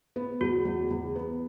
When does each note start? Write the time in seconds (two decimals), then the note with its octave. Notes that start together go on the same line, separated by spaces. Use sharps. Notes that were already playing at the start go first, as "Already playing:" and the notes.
0.16 B3
0.41 E2 F#4
0.65 E2
0.91 E2
1.15 B3